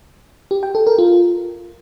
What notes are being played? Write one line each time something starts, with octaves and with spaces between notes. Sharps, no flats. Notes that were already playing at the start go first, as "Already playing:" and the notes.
G4
G5
A4
A#4
F4